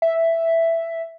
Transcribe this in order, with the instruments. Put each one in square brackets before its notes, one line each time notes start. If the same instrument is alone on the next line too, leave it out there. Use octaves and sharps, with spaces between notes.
[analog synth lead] E5